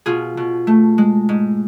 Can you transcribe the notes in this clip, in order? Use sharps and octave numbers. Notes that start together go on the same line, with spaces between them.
B2 F4 G#4
B2
A3
G#3
G#2